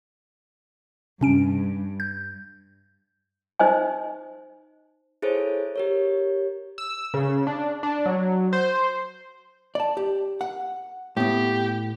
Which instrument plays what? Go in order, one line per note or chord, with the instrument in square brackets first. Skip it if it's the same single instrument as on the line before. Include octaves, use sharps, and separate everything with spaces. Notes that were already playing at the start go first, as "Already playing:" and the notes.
[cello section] G2 [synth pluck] C3 C#4 D7
[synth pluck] G6
[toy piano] D#4 C5 D#5 G#5
[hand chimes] E4 G#4 A4 C5 C#5
G4 A#4 C#5
[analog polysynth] E6
C#3
D4
D4
F#3
C5
[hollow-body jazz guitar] D5 A5
G4
F#5
[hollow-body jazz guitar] A2 B3 [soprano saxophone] G4